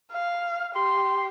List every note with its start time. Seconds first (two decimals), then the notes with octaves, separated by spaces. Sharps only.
0.12 F5
0.75 G4 C6